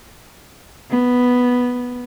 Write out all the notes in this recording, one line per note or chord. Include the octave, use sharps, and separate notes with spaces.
B3